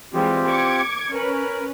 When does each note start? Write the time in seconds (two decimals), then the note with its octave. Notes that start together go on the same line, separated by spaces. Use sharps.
0.14 E3 G3 G#3 C4 F4 G4
0.46 D6 G#6 C#7
1.13 C#4 A#4 B4